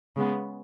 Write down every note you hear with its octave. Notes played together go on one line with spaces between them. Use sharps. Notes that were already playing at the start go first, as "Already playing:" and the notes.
C#3 G#3 B3